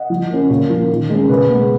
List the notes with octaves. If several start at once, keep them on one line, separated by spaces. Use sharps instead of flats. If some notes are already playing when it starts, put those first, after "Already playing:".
Already playing: D#5 F#5
F3
A#3 C#4
A#2
F3 A#3 C#4
D#3
G#3 C#4
B2 G#4 B4
G#3 B3